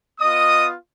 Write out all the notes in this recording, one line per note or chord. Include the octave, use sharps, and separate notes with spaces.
B3 F4 D#5 D#6